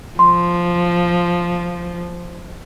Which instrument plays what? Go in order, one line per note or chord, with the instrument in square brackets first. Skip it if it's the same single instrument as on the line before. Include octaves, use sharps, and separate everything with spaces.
[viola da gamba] F3 [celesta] C6